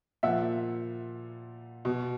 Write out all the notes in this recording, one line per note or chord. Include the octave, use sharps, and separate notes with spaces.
A#2 F3 E5 F#5
B2